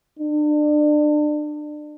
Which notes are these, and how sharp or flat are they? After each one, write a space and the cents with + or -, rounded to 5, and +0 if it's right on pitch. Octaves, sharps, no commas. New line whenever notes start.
D4 +30